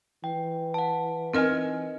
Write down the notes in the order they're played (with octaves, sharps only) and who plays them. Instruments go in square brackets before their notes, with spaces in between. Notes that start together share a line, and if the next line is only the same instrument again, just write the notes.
[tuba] E3 [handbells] G5
[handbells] F#5 A5
[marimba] C4 A#4 F6 [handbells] D#4 D#5 G#5